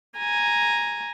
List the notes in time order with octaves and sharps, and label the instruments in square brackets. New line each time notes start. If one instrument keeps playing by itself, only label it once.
[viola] G#5 A#5